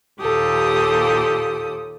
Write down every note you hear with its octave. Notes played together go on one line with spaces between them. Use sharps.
D#2 A#2 G4 A4 D#6